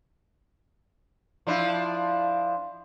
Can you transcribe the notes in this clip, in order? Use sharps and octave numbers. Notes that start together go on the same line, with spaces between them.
F3 D4 E4